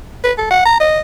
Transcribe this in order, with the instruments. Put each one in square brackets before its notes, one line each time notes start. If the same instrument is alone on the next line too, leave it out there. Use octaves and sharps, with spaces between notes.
[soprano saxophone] B4
A4
F#5
A#5
D#5